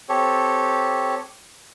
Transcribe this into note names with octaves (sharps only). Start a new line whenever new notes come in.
C4 G4 A4 C#5